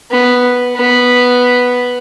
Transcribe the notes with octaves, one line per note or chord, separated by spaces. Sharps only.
B3
B3